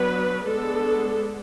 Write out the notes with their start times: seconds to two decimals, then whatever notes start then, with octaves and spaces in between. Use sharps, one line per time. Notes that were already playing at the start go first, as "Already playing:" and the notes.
Already playing: F#3 B3 D4 B4
0.45 G#3 B3 D4 A4